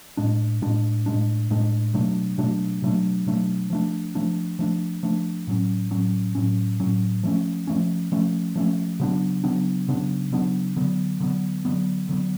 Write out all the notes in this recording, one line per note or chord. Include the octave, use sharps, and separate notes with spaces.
A2 G#3 D4
A2 G#3 D4
A2 G#3 D4
A2 G#3 D4
B2 F#3 A3 D4
B2 F#3 A3 D4
B2 F#3 A3 D4
B2 F#3 A3 D4
F3 A3 D4
F3 A3 D4
F3 A3 D4
F3 A3 D4
A2 F#3 C#4
A2 F#3 C#4
A2 F#3 C#4
A2 F#3 C#4
F3 A3 C#4
F3 A3 C#4
F3 A3 C#4
F3 A3 C#4
C#3 F#3 B3 D4
C#3 F#3 B3 D4
C#3 F#3 B3 D4
C#3 F#3 B3 D4
D3 F#3 B3
D3 F#3 B3
D3 F#3 B3
D3 F#3 B3